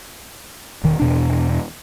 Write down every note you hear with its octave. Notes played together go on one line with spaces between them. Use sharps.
E1 D#3
E2 B2 D4